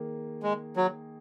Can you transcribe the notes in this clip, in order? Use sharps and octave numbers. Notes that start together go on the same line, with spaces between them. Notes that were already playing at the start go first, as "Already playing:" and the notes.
Already playing: D#3 A#3 G#4
G#3
F#3